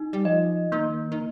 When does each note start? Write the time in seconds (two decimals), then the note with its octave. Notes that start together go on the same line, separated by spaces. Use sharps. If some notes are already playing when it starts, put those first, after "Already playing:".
Already playing: D#4
0.13 G3
0.25 F3 D#5
0.72 D#3 A#3
1.12 D#3